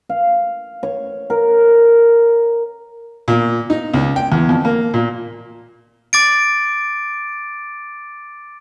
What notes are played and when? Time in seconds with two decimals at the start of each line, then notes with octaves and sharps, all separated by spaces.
0.09 F5
0.83 C#5
1.30 A#4
3.28 A#2
3.70 D#4
3.94 C#2
4.16 G5
4.32 E2
4.49 F2
4.65 A#3
4.94 A#2
6.13 D6 A6 D7